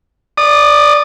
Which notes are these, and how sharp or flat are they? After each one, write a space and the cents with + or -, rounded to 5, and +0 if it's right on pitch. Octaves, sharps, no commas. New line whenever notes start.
D5 +0 D#6 -25